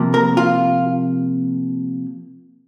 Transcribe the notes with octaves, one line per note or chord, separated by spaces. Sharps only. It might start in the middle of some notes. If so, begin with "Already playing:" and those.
Already playing: C3 F3 A#3
A#4
F4